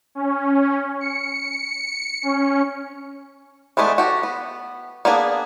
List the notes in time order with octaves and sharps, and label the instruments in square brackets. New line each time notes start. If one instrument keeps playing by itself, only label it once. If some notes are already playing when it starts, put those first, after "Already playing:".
[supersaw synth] C#4
C#7
C#4
[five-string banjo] E3 G#3 A3 B3 D4
F#4 G4 A4
B3
A#3 B3 D4 G#4